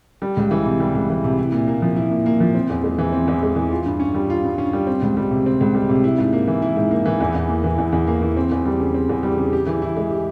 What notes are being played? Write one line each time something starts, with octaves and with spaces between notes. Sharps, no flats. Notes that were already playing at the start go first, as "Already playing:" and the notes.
G3
C#2
E3
C3
G3
C#2
E3
C3
E4
A#2
A#3
F3
E4
A#2
A#3
F3
C4
E2
G#3
E3
C4
E2
G#3
E3
F4
G2
C#4
G3
F4
G2
C#4
G3
C4
C#2
G3
C3
C4
C#2
G3
C3
E4
G#2
A#3
E3
E4
G#2
A#3
E3
E2
E2
A#3
E3
E2
E2
A#3
E3
C4
E2
G3
C#3
C4
E2
G3
C#3
G4
E3
E4
G#3
G4